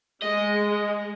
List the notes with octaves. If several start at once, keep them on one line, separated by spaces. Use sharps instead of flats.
G#3 D#5